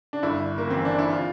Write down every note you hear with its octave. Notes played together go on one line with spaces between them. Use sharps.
D4
G1 E4
A#3
E3 C4
D4
E4
F4